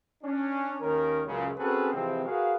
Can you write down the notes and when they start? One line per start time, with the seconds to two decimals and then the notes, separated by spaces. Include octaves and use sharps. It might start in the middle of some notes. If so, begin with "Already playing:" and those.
0.23 C#4 D4
0.81 D#2 D#3 C#4 A#4
1.25 C#2 F#2 A#2 C#3
1.57 C4 C#4 F#4 G#4 A4 B4
1.91 C3 E3 F3 G#3 C4
2.25 F#4 G#4 A#4 B4 F5